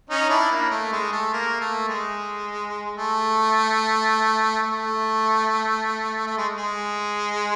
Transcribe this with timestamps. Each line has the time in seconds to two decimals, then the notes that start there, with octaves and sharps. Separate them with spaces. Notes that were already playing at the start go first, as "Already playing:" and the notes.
0.10 C#4 D#4
0.30 D4 E4
0.51 A#3
0.71 A3
0.92 G#3
1.12 A3
1.34 A#3
1.60 A3
1.88 G#3
2.97 A3
4.63 A3
6.27 A3
6.37 G#3
6.55 G#3